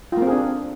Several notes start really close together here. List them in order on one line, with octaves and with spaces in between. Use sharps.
F4 A#3 C4 G#4 D4